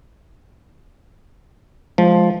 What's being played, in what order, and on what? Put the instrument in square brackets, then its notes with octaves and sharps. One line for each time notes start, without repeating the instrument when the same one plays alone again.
[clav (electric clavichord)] F3 [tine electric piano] G#3